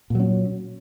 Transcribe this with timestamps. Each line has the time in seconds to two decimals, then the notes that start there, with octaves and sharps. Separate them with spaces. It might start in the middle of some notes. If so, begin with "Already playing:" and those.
0.10 A#2
0.15 F#3
0.20 C#4